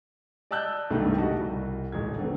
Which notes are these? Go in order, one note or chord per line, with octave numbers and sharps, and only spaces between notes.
D5 D#5 A5 E6 F#6 G6
C2 G2 B2 D#3 G#3 A3
F#4 G4 D#5 A5
C2
D#1 A1 G#3 G#6
D3 F#3 B3 C4